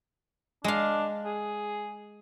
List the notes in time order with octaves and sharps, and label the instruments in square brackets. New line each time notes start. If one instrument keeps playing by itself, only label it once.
[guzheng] G#3 F5 [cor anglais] D4
[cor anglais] G#4